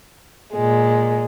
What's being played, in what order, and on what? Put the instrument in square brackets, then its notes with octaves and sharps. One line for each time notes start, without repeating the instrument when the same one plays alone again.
[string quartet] A#2 G#3